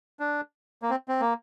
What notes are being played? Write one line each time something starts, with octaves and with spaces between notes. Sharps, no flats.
D4
A#3
C4
C4
A#3